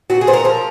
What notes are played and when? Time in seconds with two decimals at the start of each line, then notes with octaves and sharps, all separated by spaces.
0.10 A#2 F#4
0.21 G#4
0.27 A#2 C5
0.33 A#4
0.45 F3 A#4